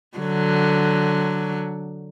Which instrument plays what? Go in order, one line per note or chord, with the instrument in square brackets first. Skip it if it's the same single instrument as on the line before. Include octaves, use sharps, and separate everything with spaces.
[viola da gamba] D3 F#3